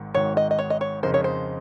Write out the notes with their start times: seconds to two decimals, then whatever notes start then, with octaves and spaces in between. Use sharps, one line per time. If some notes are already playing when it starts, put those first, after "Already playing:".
Already playing: G#1 G#2 D#3
0.14 G#1 G#2 D#3 C#5
0.37 D#5
0.51 D#5
0.59 C#5
0.70 D#5
0.81 C#5
1.03 F2 C#3 G#3 D#4 A#4 C5
1.14 C#5
1.24 C5